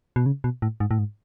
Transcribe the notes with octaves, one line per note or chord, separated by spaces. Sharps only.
B2
C#3
B2
A2
G#2
A2
G#2